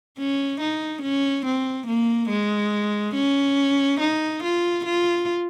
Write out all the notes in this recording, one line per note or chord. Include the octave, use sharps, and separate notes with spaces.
C#4
D#4
C#4
C4
A#3
G#3
C#4
D#4
F4
F4